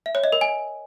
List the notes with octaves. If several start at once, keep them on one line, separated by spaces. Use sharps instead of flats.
E5
C#5
D#5
A#4
G#5